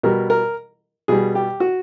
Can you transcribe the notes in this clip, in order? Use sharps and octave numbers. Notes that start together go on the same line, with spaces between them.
B2 G3 A#4
A#4
B2 G3 G#4
G4
F#4